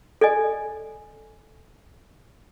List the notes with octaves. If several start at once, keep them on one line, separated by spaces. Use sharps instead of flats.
A4 D5 D#5 G#5